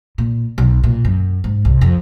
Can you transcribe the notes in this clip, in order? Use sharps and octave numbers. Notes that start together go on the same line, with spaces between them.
A#2
B1
A#2
F#2
G#2
C2
F2